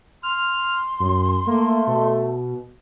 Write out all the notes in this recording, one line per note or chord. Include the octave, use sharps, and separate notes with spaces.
C6 F6
F#2
A3 A#3
B2